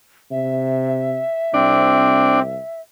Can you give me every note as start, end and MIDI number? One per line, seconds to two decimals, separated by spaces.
0.31 1.22 48
0.31 2.81 76
1.54 2.58 36
1.54 2.42 60
1.54 2.40 62